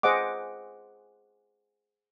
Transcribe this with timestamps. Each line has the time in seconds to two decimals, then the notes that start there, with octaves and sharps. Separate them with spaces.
0.03 G#4 C5 D#5 F#5 D6